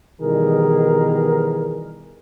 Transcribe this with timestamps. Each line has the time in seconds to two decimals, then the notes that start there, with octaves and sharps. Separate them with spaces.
0.21 B2 D#3 E3 G3 G#4 A#4